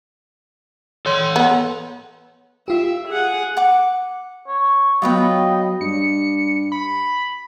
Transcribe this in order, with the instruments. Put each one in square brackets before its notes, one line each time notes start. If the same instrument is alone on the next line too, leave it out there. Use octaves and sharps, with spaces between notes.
[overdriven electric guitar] A4 C6 [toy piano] C#5
[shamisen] B3
[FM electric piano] F4 G4 [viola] E5
[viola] G#4 F#5
[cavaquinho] F#5 D6
[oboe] C#5
[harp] F#3 B3 [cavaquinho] F4 B4 G5 [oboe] D#5
[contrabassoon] G2 [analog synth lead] C#7
[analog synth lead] B5